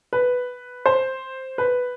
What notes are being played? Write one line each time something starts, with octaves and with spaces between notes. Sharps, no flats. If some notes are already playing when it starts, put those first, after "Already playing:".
B4
C5
B4